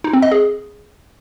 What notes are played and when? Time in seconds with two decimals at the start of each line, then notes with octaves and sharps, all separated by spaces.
0.04 D#4
0.13 C4
0.22 D#5
0.32 G#4